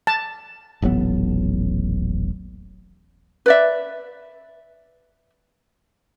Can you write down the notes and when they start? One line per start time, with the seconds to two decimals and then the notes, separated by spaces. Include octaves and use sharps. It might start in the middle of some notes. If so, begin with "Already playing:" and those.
0.07 A5
0.82 D#1 A1 F#3 B3
3.46 B4 D5 E5